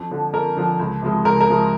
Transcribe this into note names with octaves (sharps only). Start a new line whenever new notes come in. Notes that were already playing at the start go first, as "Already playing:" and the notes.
Already playing: F2
D3 F3
F2 A#4
D3 F3
C#2
C3 F3 G#3
C#2 A#4
A#4
C3 F3 G#3